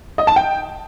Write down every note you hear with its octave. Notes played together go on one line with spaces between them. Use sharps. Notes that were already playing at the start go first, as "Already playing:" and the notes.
D#5
A5
G5